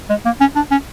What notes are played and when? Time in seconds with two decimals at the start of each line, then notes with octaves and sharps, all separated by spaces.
0.09 G#3
0.25 A#3
0.40 C#4
0.56 D4
0.71 C#4